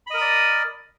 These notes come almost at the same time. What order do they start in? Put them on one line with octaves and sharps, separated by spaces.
B5 D#5 A#4 D#6 D5